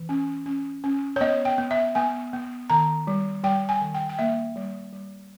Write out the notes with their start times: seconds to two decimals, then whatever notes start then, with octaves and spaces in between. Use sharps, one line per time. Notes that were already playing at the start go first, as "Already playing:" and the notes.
Already playing: E3
0.09 C#4
0.46 C#4
0.84 C#4
1.16 C#5
1.21 B3 D#5
1.45 G5
1.58 B3
1.71 E5
1.95 B3 G#5
2.33 B3
2.70 D#3 A#5
3.07 G3
3.44 G3 G5
3.69 G#5
3.81 D#3
3.94 G5
4.09 G5
4.19 A#3 E5
4.56 G3
4.92 G3